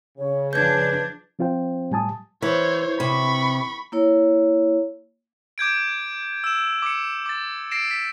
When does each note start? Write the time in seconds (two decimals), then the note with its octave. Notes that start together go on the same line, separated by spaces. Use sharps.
0.18 C#3 C#5
0.53 F3 D4 B4 G6 G#6
1.39 F3 C4 F4 C5 G5
1.91 A2 G3 G#5 A5 D#6
2.42 E3 C5 C#5
3.00 C3 B5 C#6
3.92 A#3 E4 C#5
5.58 D6 G6 G#6 D7
6.44 E6 E7
6.82 D6 C#7
7.26 D6 A6
7.71 A#6 C7 D7 E7
7.91 B6